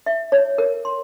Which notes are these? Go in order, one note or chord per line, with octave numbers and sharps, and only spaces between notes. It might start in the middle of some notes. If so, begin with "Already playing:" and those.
E5
C#5
A#4
C6